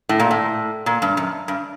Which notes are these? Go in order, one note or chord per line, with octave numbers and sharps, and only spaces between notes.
A2
A#2
A2
A#2
G2
F#2
G2